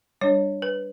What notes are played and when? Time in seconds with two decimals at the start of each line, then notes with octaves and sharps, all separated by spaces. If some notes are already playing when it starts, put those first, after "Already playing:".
0.21 G3 D4 C#5
0.62 B4